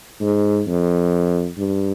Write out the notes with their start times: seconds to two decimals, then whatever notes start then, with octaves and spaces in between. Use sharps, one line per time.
0.21 G#2
0.67 F2
1.58 G2